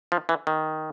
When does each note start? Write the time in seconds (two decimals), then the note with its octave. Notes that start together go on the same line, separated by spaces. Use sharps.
0.12 F3
0.29 E3
0.47 D#3